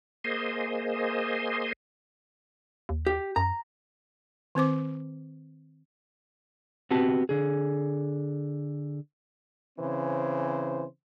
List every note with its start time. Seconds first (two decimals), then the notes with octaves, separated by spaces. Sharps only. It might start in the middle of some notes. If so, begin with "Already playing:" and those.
0.24 A#3 G#4 C5 D#5
2.89 D#2
3.06 G4
3.36 F#2 A#5
4.55 D#3 C4 C5 D6
6.91 B3 C4 F#4 G4 A5
7.29 D3 G#4
9.79 C#3 E3 C4 C5